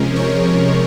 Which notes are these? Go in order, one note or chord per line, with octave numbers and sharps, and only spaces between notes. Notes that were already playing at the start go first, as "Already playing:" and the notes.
Already playing: C3 F3 G#3 C#4 A#4
C#5